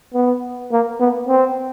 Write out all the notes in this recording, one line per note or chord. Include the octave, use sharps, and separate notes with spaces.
B3
A#3
B3
C4